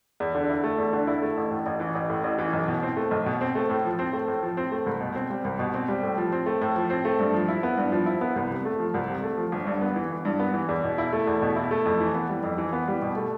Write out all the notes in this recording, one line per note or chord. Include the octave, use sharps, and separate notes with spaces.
E2
D3
E4
A3
E2
D3
E4
A3
A1
A2
A1
E3
A1
A2
A1
E3
B1
B2
C4
A3
B1
B2
C4
A3
A2
F3
C4
A3
A2
F3
C4
A3
C2
B2
C4
G3
C2
B2
C4
G3
A2
F3
C4
A3
A2
F3
C4
A3
G2
F3
E4
B3
G2
F3
E4
B3
C2
C3
A3
F3
C2
C3
A3
F3
G1
G2
B3
E3
G1
G2
B3
E3
E2
B2
E4
A3
E2
B2
E4
A3
F2
E3
B3
G3
F2
E3
B3
G3
B2
A3